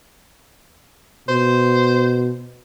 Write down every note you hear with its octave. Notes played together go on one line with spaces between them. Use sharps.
B2 C5